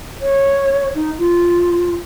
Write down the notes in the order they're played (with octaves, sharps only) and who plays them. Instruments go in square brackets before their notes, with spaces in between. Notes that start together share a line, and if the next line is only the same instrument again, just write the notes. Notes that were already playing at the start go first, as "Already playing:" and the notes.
[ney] C#5
D#4
F4